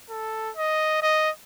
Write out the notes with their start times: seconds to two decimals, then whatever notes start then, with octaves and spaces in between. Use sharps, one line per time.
0.10 A4
0.57 D#5
1.02 D#5